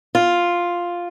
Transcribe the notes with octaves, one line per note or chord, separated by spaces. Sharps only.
F4